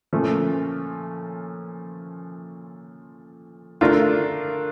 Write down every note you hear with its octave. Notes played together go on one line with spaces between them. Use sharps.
A#2 F3 A3 C#4
A3 D4 F4 A#4